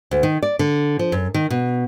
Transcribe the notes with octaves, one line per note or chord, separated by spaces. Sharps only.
D2
D#3
D5
D3
F3
F#2
D#3
B2